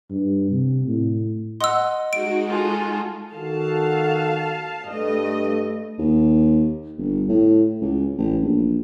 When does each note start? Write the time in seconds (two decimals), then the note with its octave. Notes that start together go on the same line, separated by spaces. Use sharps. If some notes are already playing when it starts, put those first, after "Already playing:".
0.10 G2
0.51 C3
0.87 A2
1.61 D#5 F#5 C6 E6
2.13 G#3 D#4 F#4 D7
2.48 F4 G#4 A4
3.33 D#3 F#4 A4 F5 A5
4.86 G2 A3 D#5
5.98 D#2
6.98 G1
7.28 A2
7.81 C#2
8.18 A1
8.43 A#1